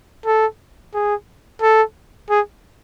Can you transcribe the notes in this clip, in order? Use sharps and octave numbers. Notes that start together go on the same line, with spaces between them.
A4
G#4
A4
G#4